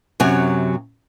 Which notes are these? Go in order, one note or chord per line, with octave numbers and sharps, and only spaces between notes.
F#2 C3 F#3 G#5